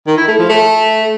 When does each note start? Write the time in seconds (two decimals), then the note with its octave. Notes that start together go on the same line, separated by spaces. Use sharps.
0.07 D#3
0.18 E4
0.28 A3
0.39 F3
0.49 A3